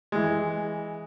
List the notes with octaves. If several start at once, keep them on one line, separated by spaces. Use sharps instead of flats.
E3 G#3